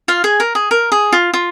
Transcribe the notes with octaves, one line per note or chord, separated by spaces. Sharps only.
F4 F5
G#4 G#5
A#4
G#4
A#4
G#4
F4
F4